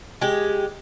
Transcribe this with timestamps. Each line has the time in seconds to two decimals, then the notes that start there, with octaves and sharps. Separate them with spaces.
0.21 G#3 G4